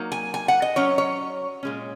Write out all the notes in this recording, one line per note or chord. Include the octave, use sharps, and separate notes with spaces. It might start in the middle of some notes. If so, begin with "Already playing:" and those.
Already playing: F#3 A#3 D#4
G#5
G#5
F#5
D#5
F#3 C#4 C#5
C#5
A#2 G#3 C#4